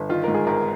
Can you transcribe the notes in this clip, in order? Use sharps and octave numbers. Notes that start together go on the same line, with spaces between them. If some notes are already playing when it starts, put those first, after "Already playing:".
Already playing: G1
D#3 F4
G#2 A#4
G#4
G#1 A#4